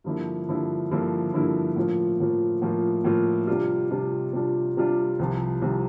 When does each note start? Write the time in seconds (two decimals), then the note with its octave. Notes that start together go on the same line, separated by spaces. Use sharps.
0.04 G2 D3 F3 A#3 E4
0.48 G2 D3 F3 A#3 E4
0.91 G2 D3 F3 A#3 E4
1.33 G2 D3 F3 A#3 E4
1.76 A2 F3 A#3 F4
2.20 A2 F3 A#3 F4
2.62 A2 F3 A#3 F4
3.04 A2 F3 A#3 F4
3.47 C3 G3 D4 F4
3.91 C3 G3 D4 F4
4.33 C3 G3 D4 F4
4.77 C3 G3 D4 F4
5.19 C2 C3 F3
5.62 C2 C3 F3